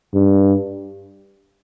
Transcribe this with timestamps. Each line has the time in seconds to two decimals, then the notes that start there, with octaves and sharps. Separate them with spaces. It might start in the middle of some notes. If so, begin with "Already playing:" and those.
0.14 G2